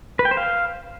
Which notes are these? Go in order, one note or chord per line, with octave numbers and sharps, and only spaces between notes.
B4
G5
C5
F5